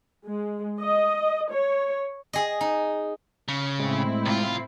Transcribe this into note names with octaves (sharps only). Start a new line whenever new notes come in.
G#3
D#5
C#5
G#4 D#5
D#4
C#3
A2 G#3 C4 E4
C2 F4